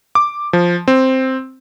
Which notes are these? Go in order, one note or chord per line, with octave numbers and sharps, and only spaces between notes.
D6
F3
C4